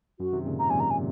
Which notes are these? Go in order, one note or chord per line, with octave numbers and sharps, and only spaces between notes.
F#2 F#4
C3 D#3
A#2 C#3
G#2 C3 A#5
F#2 A#2 G#5
F#2 A#5
G#5